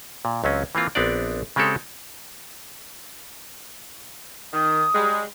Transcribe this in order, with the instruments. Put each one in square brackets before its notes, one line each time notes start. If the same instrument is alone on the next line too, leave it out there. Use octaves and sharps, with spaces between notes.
[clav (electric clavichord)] A#2
C#2 F#3 C4 C#4
E3 A#3 C4 F4
A#1 B3 C4 D4 D5
C#3 G#3 C4 G4 A4 C#5
[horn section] D#3 [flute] D#6
[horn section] G3 G#3